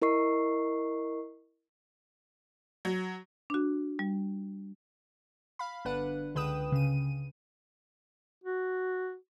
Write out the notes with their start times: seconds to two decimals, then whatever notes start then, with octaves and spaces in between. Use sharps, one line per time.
0.02 E4 A#4 D#5 C#6 C7
2.85 F#3
3.50 D4 F#4
3.99 G3
5.59 F5 B5
5.85 G1 D3 D4 B4 F#5
6.35 C#2 D3 B4 G5 D#6 E7
6.72 C#3 D#7
8.44 F#4